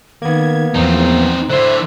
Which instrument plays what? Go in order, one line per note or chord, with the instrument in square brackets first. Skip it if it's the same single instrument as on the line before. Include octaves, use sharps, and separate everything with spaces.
[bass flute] D#3 [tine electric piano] A#3 B3 [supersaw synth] G#6
[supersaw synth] E2 [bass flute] F3 [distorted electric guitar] C4 D#4
[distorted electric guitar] D3 E4 [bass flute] C5 [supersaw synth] E5 [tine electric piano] C6 F#6